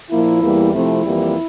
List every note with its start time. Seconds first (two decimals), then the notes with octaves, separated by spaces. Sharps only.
0.11 A#2 F3 A#3 E4
0.42 E2 E3 G3 A#3
0.73 C3 F3 A3 C4 E4
1.04 F2 E3 G3 A#3